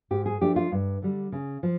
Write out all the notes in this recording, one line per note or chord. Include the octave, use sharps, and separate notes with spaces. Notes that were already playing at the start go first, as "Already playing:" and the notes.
G#2 G4
G#4
F3 A3 D4 G4
F4
G2
D3 G3
C#3
F3